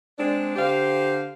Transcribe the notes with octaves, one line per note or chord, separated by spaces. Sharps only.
G#3 C4 D4
D3 G4 C5 F5